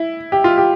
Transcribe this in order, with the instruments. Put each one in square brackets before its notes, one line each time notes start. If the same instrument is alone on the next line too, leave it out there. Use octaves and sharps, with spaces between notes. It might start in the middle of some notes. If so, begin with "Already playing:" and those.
Already playing: [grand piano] E4
G4
F4
G4